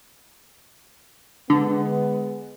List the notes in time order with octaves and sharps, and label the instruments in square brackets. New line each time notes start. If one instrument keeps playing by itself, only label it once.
[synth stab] D3 [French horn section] G#3 B3